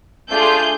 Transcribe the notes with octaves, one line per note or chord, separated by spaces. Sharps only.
A3 D4 F4 G#4 G6